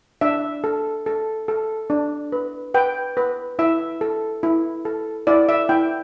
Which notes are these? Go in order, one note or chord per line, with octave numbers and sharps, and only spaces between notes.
D4 E5
A4
A4
A4
D4
B4
B4 G5
B4
E4 E5
A4
E4
A4
E4 D5
E5
E4 G5